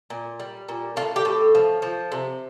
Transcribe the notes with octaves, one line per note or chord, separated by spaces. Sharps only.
A#2
G3
A#2
A2 F4
G4
A2
F3
F3
C3